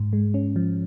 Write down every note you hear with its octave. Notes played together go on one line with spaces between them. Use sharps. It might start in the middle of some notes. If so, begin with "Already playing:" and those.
Already playing: G#2
G#3
C#4
F3